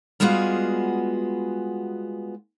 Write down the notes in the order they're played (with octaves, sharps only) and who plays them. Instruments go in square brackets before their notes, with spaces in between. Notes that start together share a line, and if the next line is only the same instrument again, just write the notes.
[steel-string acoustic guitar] G3 G#3 B3 F4 F#4 G#4